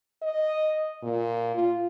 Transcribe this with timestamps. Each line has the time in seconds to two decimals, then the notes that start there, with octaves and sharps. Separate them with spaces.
0.22 D#5
1.03 A#2
1.55 F4